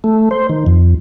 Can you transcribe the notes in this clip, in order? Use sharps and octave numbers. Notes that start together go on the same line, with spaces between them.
A3
C5
D#3
F2